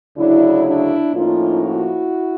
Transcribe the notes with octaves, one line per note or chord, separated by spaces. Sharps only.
D2 C#3 F#3 D4 E4
D4 E4
A2 F3 A#3 C#4 D#4 F4
E4 F#4